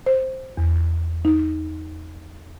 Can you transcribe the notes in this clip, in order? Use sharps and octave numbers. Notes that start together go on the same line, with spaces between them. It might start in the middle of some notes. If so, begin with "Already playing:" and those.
C5
E2
D#4